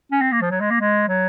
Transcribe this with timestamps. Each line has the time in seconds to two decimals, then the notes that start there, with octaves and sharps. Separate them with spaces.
0.12 C#4
0.22 C4
0.32 A#3
0.42 F3
0.51 F#3
0.61 G#3
0.71 A#3
0.80 G#3
1.08 F#3